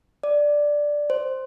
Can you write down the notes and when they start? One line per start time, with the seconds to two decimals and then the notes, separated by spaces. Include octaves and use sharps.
0.23 D5
1.10 C5